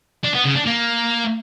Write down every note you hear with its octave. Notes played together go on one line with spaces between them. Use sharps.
D4
B3
C#3
D4
A#3